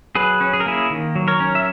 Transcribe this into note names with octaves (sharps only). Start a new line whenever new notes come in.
F#3 G#4 B4
C#4
G#4
A#4
A#3 E4 G#4
D#3
F#3
A#4 C#5
C#4
E5